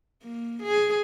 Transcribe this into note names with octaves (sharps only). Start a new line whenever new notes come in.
A#3
G#4